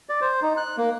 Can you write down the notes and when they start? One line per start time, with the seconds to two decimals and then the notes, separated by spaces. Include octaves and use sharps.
0.09 D5
0.21 C5
0.42 D#4
0.57 F#6
0.78 A#3